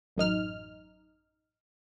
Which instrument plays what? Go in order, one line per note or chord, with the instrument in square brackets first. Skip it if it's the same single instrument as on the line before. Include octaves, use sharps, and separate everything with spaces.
[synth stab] A1 F#2 D#4 F6